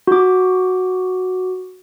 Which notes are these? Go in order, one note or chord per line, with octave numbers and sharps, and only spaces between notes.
F#4 D6